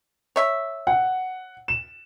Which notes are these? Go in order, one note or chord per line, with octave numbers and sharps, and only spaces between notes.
C#5 E5
F#5
E7